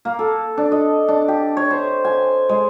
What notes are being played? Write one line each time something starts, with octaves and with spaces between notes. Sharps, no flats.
A#3
A4
D4
D#5
D4
G4
C#5
C5
G#5
G#3